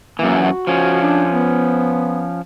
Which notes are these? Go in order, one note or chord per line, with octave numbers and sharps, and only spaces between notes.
F#2 E3 A#3
F#4
F3 C#4
D4
B3